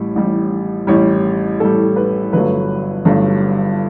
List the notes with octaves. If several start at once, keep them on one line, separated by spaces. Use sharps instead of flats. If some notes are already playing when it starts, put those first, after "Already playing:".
Already playing: A1 A2 G3
A1 A2 G3
A1 A2 G3 C#5
A1 A2 G3 A4
B4
G1 G2 F#3 A3 B4
G1 G2 F#3 A3